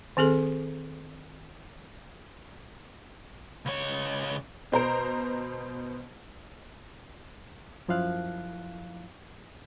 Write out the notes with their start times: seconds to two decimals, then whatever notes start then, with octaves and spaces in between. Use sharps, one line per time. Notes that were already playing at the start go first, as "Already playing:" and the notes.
0.17 D#3 C4 G#4 A4
3.65 C#2 C#5
4.72 B2 C5 A#5 D7
7.88 F#2 F3 E4 F5 F#6